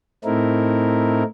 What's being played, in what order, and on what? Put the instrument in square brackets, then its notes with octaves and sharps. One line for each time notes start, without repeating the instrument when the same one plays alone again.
[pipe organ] A2 A3 C4 D#4 E4 A#4